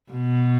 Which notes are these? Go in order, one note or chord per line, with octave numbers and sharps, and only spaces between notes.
B2